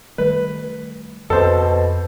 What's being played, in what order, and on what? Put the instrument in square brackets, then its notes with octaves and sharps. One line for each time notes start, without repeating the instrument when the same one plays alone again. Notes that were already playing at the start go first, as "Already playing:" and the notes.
[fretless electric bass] D#3 G3 A3 [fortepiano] B4
[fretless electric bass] F2 A#3 C4 [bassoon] B2 [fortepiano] A4 C5